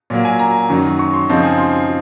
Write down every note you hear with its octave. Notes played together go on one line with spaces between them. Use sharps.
A#2 F#3 A#3
G#5
A#5
F#2 D#3 F#3
C#6
C6
F#2 C#3 F3 C4 D#4
G#5
C6
C6